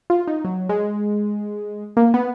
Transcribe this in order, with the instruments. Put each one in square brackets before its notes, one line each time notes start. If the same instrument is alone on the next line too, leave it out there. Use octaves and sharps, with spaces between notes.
[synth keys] F4
D#4
F#3
G#3
A#3
B3